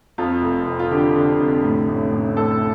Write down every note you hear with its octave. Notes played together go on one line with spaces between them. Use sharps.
F2 F4
F1
F1
F4
D3 G4
D3
F1
A2
A1
A1
A2 A4